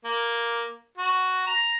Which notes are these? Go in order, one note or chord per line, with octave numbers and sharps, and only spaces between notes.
A#3
F#4
A#5